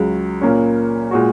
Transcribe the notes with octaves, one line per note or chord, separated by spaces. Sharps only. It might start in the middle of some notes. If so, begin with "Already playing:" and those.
Already playing: C#2 C#3 F#3
A#2 A#3 C#4
A#2 G#3 F#4